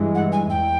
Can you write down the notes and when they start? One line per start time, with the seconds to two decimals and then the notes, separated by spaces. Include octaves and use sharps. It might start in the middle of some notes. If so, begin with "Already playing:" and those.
Already playing: G2 E3 G#3
0.15 F#5
0.32 G#5
0.50 E2 G5